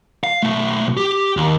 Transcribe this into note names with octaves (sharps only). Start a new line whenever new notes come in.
F5
B1 A3
G4
D#2